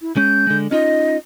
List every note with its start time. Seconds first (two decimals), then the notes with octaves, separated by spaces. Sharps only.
0.01 E4
0.17 G#3 C#4 G6
0.47 D3 G#3
0.71 C#4 D#4 F4 D#5